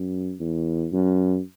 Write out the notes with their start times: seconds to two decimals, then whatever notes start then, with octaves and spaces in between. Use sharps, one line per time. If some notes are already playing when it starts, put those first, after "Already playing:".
Already playing: F#2
0.40 E2
0.93 F#2